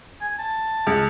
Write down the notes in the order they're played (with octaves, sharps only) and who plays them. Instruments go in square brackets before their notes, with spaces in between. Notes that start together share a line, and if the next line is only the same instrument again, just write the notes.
[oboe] G#5
A5
[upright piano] C#2